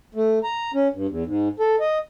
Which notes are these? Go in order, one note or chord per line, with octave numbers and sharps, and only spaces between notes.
A3
A#5
C#4
G2
E2
G#2
A4
D#5